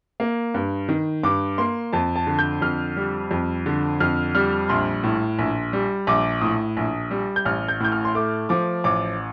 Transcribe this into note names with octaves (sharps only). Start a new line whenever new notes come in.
A#3
G2
D#3
G2 D6
A#3 C6
F2 A5
A5
D3
G6
F2 F6
G3
F2
D3
F2 F6
G3 F6
A#1 C6
A2
A#1
G3
A#1 D6
A2 D#6
A#1
G3
G6
A1 F6
G6
A2 G6
F6
C6
A3 D6
F3 D6
A1 D6